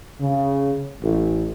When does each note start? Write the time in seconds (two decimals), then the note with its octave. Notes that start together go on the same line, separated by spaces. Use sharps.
0.20 C#3
1.01 A1